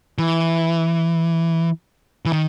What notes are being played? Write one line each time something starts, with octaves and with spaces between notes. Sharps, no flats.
E3
E3
D#3